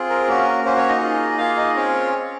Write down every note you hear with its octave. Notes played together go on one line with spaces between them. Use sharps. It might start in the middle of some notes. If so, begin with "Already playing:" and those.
Already playing: C4 F4 G#4
A#4
A#3 C#4 F#4
A#3 C#4 F#4 C5
C#4 C#5
D#4 D#5
A#3 F4 G#4
A#3 F4 G#4 F5
D#4 D#5
C4 C#4 F4 G#4 C#5